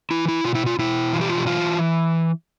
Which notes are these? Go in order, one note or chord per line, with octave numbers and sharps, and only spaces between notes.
E3 E4
E4
B2 F4
E4
F4
B2 E4
E3 F4
G4
F4
G4
E3 F4